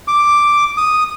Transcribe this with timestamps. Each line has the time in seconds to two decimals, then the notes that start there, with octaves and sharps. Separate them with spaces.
0.08 D6
0.77 D#6